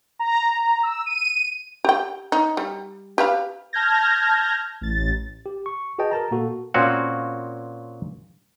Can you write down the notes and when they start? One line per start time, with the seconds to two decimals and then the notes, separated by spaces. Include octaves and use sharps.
0.19 A#5
0.83 E6
1.06 D#7
1.84 G4 G5
2.32 D#4
2.57 G3
3.18 G4 B4 F5
3.73 A5 F6 G6 G#6 A#6
4.81 A1 A6
5.46 G4
5.66 C#6
5.99 F#4 G#4 B4 D#5 G5 A5
6.11 A#4 A5 A#5
6.31 A#2 A#3 F#4 A4
6.74 A#2 C4 C#4 F#4